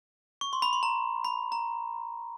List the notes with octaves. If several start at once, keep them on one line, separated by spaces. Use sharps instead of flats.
C#6
C6
B5
C6
A#5
B5
A#5